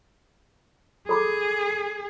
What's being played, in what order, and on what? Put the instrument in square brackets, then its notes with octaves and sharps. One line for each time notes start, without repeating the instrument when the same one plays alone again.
[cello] G#4 [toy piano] A4 B5 D6